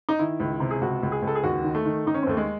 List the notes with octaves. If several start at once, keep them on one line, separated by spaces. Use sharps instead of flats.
D#4
D#3 E4
C#2
C3
G#4
C#2 F#4
C#2
G#4
C#2
A4
G#4
D#2 F#4
D#3
A3
D#3
D#3 D#4
C#4
C4
D#2 A3
G#3